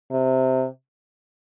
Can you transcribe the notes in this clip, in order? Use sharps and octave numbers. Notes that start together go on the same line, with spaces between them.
C3